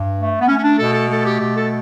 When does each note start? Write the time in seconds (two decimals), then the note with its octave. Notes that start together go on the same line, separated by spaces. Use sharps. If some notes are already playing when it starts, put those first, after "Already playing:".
Already playing: G2
0.16 A3
0.41 B3
0.47 A3 C#4
0.58 C#4
0.63 D4
0.78 B2 A4
0.94 A4
1.10 A3 A4
1.26 G4
1.41 B2 G4
1.57 A4